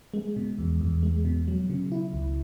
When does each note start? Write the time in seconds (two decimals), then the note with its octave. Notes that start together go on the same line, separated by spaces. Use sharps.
0.14 G#3
0.36 B2
0.58 E2
0.81 E2
1.03 G#3
1.25 B2
1.48 F#3
1.70 C#3
1.92 E4
2.13 C#2